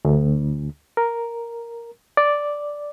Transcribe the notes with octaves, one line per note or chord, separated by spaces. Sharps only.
D2
A#4
D5